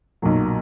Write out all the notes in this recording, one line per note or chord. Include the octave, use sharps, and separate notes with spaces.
B1 A#2 F#3